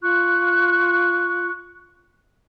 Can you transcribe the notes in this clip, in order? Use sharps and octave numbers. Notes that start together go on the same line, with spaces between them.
F4 C#6 F#6